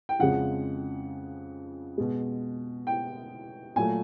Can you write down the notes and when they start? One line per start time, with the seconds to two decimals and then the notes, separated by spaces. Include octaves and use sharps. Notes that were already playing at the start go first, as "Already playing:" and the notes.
0.09 G5
0.19 F2 C#3 F3 G#3 F#5
1.98 B2 G#3
2.87 G5
3.76 A#2 F#3 A3 G#5